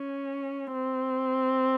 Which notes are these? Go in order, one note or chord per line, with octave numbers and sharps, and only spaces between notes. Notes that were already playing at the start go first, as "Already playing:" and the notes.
Already playing: C#4
C4